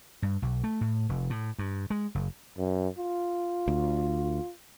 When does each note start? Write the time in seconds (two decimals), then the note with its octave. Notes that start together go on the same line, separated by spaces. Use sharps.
0.22 G2
0.42 B1
0.64 A3
0.81 A2
1.09 F1
1.30 A2
1.59 G2
1.90 G#3
2.15 F#1
2.58 F#2
2.98 F4
3.68 D2